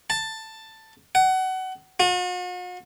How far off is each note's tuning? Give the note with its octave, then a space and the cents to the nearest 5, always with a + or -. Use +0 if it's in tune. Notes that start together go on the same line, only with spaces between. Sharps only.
A5 +10
F#5 +25
F#4 -45